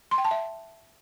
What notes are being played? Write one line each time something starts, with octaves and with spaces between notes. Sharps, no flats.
C6
G5
A5
E5